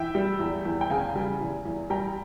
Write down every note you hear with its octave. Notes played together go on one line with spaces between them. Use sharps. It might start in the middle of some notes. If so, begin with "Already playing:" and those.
Already playing: E3 E5 G5
G3
E2
E2
G5
C#3 F5 G#5
G3
E2
E2
G3 G5 A#5